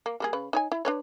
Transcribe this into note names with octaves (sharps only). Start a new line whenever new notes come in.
A#3
G3 A#3 G#4
C#3 B4
D#4 C#5 G#5
E4
D4 B4 C#5